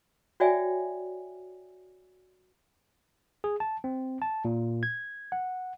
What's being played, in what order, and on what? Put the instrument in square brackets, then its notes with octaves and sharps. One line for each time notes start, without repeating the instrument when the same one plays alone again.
[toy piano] F#4 C#5 D5 E5 G5 G#5
[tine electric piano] G#4
A5
C4
A5
A#2
G#6
F#5